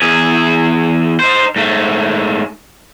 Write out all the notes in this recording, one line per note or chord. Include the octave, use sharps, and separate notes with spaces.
E2 G#4
D#4 C5
G#2 A3